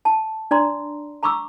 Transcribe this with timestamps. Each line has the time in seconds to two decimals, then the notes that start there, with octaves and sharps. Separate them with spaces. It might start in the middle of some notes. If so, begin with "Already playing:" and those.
0.05 A5
0.51 D4 D5 A#5 C6
1.23 A#5 B5 C#6 D6 E6